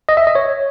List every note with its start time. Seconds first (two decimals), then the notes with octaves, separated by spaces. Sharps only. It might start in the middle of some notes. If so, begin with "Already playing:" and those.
0.09 D#5
0.17 E5
0.27 D#5
0.35 C#5